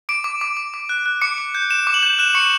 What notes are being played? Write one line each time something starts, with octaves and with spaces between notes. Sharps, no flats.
D6 D7
D6
D6
D6
D6
F#6
F#6
D6 C#7
D6
G6
G6 E7
D6
F#7
G6
F#6 E7
C#6 C#7